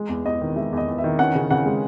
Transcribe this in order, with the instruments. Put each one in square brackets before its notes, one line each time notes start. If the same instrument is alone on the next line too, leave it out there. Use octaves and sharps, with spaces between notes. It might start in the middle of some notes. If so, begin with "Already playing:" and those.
Already playing: [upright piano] G#3
E2
E2 D#5
D#3
G#3 E5
E2 D#5
E2
E5
D#3
C#4 F#5
C#3
C#3 F#5
G#3